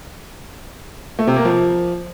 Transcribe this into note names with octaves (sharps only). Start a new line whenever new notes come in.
A3
C3
A#3
F3